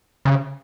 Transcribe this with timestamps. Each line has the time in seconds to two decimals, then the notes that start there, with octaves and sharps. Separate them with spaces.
0.25 C#3